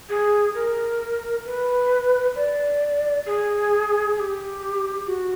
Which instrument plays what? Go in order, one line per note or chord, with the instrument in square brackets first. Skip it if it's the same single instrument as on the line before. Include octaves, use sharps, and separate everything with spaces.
[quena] G#4
A#4
B4
D5
G#4
G#4
G4
F#4